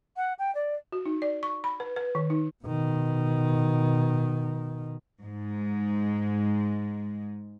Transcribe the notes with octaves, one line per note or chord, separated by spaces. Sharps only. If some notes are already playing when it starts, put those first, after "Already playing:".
F#5
G5
D5
F#4
D#4
D5
C#6
B5
B4
B4
D#3
D#4
B2 D#3
G#2 G#3